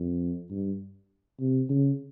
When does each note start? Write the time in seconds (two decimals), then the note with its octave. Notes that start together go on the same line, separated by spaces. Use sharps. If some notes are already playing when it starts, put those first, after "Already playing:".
Already playing: F2
0.51 G2
1.40 C3
1.69 C#3